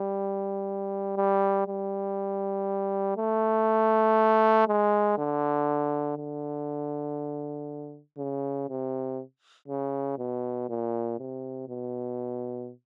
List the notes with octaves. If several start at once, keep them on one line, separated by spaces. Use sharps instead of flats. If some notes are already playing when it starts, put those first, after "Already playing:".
Already playing: G3
G3
G3
A3
G#3
D3
D3
C#3
C3
C#3
B2
A#2
C3
B2